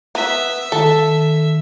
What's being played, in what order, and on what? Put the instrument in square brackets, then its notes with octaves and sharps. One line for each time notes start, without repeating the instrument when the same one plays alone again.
[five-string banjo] B3 [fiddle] E5
[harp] D#3 [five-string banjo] A4